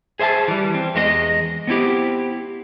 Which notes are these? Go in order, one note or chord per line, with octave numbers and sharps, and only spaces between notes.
G#4 C5 E5 G#5 A5
E3 G3
C4
E2 G#3 F4 D#5
B3 C4 E4 G4